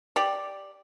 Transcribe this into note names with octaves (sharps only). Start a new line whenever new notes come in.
G4 D5